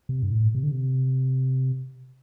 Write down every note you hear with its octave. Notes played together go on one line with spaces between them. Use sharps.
C3
G2
A2
C3
D3
C3